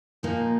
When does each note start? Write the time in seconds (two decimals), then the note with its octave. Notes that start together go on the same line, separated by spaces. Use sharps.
0.23 A#2 F3 A#3 D#4